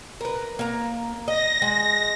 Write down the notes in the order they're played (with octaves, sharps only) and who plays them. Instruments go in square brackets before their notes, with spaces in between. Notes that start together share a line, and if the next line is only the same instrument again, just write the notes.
[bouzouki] A#4 B4
A#3 A#5
[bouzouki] D#5 [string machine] A#6
[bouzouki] G#3